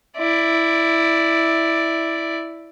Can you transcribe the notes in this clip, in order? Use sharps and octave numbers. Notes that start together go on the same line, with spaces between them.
E4 D5